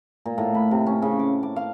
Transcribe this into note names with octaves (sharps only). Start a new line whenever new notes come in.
A#2
A2
B5
C3
C#4
C#3
D6
D6
F5